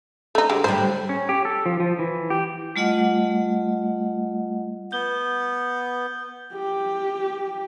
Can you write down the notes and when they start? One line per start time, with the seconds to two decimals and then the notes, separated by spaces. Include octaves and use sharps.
0.35 A3 D#4
0.49 D3 G#3 G4
0.64 A2 D3 G3 C5
1.09 C#4
1.29 G4
1.45 A4
1.66 F3
1.80 F3
1.99 E3
2.30 G4
2.76 G3 A3 F4 D#5 F#5
4.92 B3 G6 G7
6.54 G4